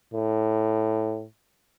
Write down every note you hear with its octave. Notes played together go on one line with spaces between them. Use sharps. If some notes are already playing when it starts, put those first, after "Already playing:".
A2